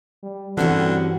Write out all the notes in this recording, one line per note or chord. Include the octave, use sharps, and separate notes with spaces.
G3
G2 D3 E3 G3 C4 C#4 F#4